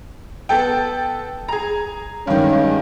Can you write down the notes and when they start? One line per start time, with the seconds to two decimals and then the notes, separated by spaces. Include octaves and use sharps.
0.49 B3 A4 G5
1.48 G#4 A#5
2.27 G2 D#3 G#3 C#4